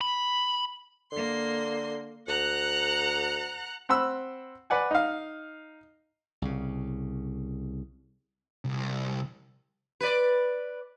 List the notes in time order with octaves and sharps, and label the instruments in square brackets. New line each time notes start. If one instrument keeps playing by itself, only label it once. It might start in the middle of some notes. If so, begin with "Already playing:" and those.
[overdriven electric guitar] B5
[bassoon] D3 [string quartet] A#3 C6
[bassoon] D2 [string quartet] F#5 A#5 F#6
[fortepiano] C4 F#5 B5 E6
B4 D5 F#5 G#5
D#4 F5
[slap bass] C2 C#3
[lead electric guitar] C2
[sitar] B4 D5